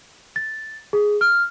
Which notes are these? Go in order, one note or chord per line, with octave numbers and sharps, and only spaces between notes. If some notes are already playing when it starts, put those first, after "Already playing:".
A6
G#4
F6